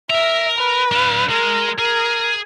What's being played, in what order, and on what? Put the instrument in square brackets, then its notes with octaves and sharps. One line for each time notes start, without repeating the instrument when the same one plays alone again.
[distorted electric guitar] A#4 A#5 [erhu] E5
[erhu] B4
[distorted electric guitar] D4 F5
[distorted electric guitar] G#3 [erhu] A#4
[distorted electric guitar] G#4 [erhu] A#4